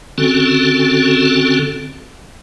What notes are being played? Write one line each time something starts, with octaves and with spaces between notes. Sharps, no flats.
D3 C4 C#4 F#4 A4